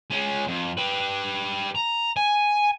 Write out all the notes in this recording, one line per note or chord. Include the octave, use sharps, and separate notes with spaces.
G#3 C#4
F2
G4 B4
A#5
G#5